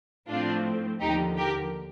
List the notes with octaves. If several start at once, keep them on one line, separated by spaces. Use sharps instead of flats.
A2 F3 A3 C4 D4 F4
D#2 D3 F3 D#4 G4
G4 A#4